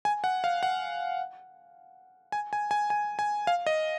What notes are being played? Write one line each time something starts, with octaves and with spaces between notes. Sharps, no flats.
G#5
F#5
F5
F#5
G#5
G#5
G#5
G#5
G#5
F5
D#5